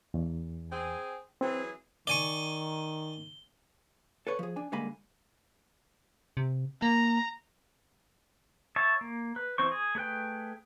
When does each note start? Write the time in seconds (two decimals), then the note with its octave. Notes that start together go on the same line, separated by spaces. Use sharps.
0.14 E2
0.72 C4 G#4 G#5
1.41 E3 F#3 C4 G#4
2.07 D#3 D5 G#5 C#6 G7
4.27 A4 B4 C#5
4.39 F3 G#4
4.56 D4 G#5
4.72 D3 G3 G#3 A#3 G#5 B5
6.37 C3
6.82 A#3 A#5
8.76 C#5 E5 A5
9.01 A#3
9.36 B4
9.58 E3 C4 C5 C#6
9.72 G#4
9.95 A3 G#4 B4 G5